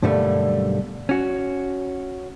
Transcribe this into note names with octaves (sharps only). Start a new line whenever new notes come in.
B1 G2 D3 G3 A3 A#3
C#4 F#4